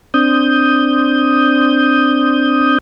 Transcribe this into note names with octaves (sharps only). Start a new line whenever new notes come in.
C4 D4 D#6 G6